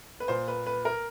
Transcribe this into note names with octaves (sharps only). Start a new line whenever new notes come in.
B4
A#2 C5
B4
B4
A#4